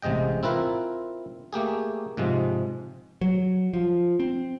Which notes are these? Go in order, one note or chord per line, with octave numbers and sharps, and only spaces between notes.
A1 C3 G#3 D#5 G5
C4 E4 F4 A#4 B4
A3 A#3 G4 G#4
G#2 C3 F3 G#3
F#3
F3
C4